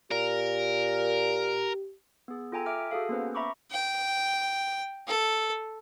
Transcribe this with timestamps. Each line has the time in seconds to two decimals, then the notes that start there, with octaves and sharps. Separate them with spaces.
0.11 A#2 G4 A#4
2.28 B3 G#4
2.52 F4 A4 G5 G#5 A#5
2.66 E5 D6 F6 D7
2.91 F#4 G#4 A4 F5
3.09 A#3 B3 C#4 B4 C5
3.35 E5 A#5 B5 C#6 D6
3.71 G5
5.08 A4